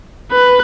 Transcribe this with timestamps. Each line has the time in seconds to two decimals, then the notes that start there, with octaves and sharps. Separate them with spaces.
0.32 B4